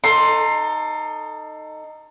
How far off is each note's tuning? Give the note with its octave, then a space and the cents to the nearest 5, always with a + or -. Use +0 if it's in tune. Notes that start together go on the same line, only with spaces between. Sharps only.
D#4 -10 A4 +20 C6 +10